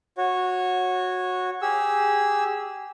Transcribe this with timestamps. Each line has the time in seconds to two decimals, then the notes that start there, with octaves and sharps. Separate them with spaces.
0.18 F#4 C#5
1.62 G4 G#4 E6